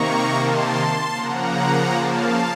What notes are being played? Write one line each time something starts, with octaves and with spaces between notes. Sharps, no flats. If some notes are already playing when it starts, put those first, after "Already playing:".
Already playing: C3 D#3 A#3 A#5 C#6
A5 C6
C#3 F3 A#3 F#5 A#5
F5 A5